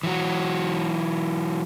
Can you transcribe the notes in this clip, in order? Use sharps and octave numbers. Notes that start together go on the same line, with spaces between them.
E3 F#3 F#4